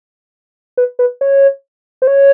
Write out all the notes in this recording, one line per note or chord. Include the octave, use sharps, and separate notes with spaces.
B4
B4
C#5
C5
C#5